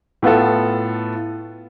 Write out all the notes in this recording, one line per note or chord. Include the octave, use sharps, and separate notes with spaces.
A2 B3 F4 A4